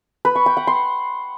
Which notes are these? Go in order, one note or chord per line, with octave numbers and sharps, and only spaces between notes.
B4
C#6
G5
F#5
C6